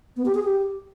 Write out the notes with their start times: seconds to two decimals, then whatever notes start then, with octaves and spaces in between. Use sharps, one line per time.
0.17 B3
0.26 G4
0.35 G#4
0.44 G4